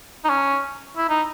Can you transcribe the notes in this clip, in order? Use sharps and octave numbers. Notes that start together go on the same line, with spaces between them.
D#4
C#4
E4
D#4